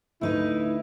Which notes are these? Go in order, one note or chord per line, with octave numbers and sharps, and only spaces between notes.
D2 D#4 E4 B4